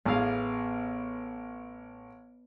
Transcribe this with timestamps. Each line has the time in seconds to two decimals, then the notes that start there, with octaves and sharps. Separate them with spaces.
0.05 A1 B3 G#4 F5